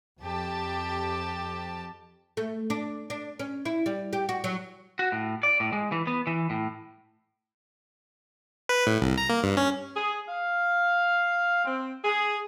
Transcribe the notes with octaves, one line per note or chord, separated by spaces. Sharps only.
F2 G4 A5
A3
D4
D4
C#4
E4
G3
G4
F#4
F#3
F#4
A2
D5
A2
G#3
E3
B3
E3
A2
B4
A2
C2
A#5
A#3
G2
C#4
G#4
F5
C4
G#4